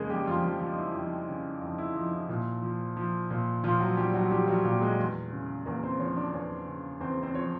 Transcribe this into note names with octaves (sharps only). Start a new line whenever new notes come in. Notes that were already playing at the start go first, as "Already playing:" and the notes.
Already playing: F2 C#3 G#3 A#3 G#4 A#4
G3 G4
F2 F3 F4
F3 F4
F3 F4
D#4
E4
F2 D#4
C#3
F2 D#4
E4
F3 D#4
E4
A#2
F3
F3
A#2
A#2 F3 F4
F#3 F#4
F3 G3 G4
F#3 F#4
F3 G3 G4
F#3 F#4
A#2 G3 G4
G#3 G#4
E2
C#3
E2 A#3 A#4
C4 C5
F3 C#4 C#5
D4 D5
E2 C#4 C#5
C#3
E2 C4 C5
C4 C5
F3 C#5